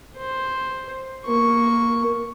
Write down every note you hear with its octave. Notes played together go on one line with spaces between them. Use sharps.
C5
A#3 C#6